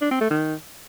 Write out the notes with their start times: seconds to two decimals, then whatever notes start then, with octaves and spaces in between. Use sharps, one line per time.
0.01 D4
0.11 C4
0.21 A3
0.30 D#3